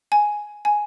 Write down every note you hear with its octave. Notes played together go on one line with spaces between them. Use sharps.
G#5
G#5